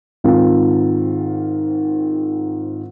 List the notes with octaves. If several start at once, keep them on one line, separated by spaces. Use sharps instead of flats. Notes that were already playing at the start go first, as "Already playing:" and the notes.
G#2 D#3 C4 F4